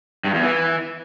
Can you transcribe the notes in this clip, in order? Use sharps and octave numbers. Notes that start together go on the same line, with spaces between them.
G2
E2
E3